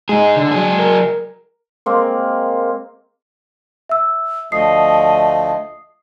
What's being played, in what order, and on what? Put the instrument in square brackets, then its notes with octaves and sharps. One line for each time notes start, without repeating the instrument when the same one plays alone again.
[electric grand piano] G#3 [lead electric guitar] D#4 G#4
[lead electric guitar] D3
F#3 G#4
[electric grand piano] A#4
[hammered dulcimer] G#3 A#3 C4
[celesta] E5 E6
[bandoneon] D2 F3 A3 [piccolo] D#5 [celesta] D#6 C7